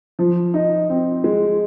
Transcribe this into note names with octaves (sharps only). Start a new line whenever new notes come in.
F3
D#4
C4
G#3